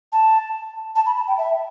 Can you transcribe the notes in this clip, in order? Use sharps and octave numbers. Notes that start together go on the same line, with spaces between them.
A5
A5
B5
A5
G5
E5